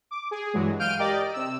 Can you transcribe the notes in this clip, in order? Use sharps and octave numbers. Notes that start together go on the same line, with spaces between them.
D6
G#4
G2 E3 F#3 G#3
F5 F6 G6 D7 D#7
G4 A#4 D5 D#5
C3 E6